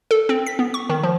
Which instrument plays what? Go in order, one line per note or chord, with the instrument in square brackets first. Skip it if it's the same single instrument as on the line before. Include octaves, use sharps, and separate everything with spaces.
[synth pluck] A4
C4
B6
B3
C#6
D#3
F3